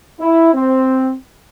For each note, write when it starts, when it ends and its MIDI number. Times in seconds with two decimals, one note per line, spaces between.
0.20 0.53 64
0.54 1.14 60